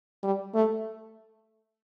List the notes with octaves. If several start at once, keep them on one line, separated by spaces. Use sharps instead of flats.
G3
A3